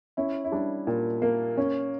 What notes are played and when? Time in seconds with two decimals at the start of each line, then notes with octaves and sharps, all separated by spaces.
0.17 C#4 E4
0.44 E4
0.52 G3 D4
0.87 A#2
1.22 A#3
1.57 C#4